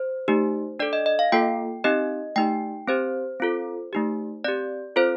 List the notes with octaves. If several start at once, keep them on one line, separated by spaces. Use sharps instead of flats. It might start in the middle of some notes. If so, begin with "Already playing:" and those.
Already playing: C5
A3 D#4 G4
D4 A4 D5
D#5
D#5
F5
A#3 F4 A4 G5
C4 D#4 G4 D#5
A3 D#4 G4 G5
C4 G4 C5
C4 F4 A4
A3 D#4 G4
C4 G4 D5
C4 F4 A4 C5